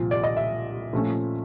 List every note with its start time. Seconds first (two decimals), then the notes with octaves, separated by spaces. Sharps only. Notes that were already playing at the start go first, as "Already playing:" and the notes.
Already playing: C2 A#2 F3
0.11 D5
0.24 D#5
0.37 E5
0.93 A#2 F3 A3 C#4